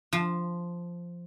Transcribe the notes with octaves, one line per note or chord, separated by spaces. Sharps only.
F3